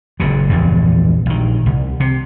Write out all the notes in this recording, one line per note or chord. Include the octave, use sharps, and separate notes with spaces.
F#1 A#2 C#3
A#1 E2 G2 A#2
A#1 D#3
C2
C3